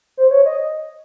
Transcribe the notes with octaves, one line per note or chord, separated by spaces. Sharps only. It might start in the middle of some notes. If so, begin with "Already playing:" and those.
C5
C#5
D#5